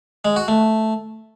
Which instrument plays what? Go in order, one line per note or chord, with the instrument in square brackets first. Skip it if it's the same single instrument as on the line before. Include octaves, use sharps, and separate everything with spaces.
[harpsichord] G#3
F#4
A3